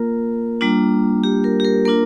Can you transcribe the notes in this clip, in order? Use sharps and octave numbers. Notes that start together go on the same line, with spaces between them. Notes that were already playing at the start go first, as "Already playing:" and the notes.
Already playing: A#3 F4 A#4
G3 A#3 D4 F4
G4
A#4
G4
A#4
A#3 D4 F4 A#4